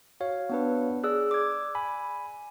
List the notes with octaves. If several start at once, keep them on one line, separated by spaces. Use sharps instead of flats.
F#4 C#5 F5
B3 D4 B4
G#4 D5 E6 F#6
D6 G#6
G#5 B5